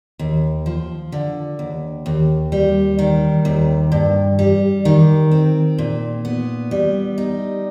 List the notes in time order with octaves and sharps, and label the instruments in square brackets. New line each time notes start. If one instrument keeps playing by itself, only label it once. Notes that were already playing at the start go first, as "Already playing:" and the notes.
[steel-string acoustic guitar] D#2
F3
D3
D#2
D#2
G3
D#3
D#2
G2
G3
D#3
C4
A#2
B3
G3
D#4